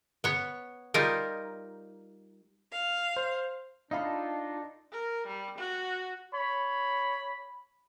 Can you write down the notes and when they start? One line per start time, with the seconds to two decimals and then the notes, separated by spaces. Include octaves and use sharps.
0.24 B3 C#5
0.94 G3 D#4 F4 A#4
2.72 F5
3.16 C5
3.91 D4 D#4 F4 A4 D#5 F5 B5
4.92 A#4
5.27 G3
5.58 F#4
6.33 C#5 B5